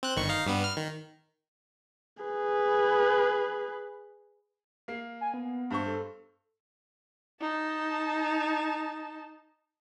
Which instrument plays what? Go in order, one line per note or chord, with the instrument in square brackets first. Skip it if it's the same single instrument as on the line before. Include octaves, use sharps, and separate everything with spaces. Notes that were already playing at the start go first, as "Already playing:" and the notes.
[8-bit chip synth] C4 F#6
G1 D#3 C#6
D#4 F5
G2 G3 B3
F6
D#3
[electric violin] G#4 B4
[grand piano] A#3 C7
[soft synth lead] G#5
B3
[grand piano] G2 C5 C#6
[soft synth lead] A4
[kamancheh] D#4 A5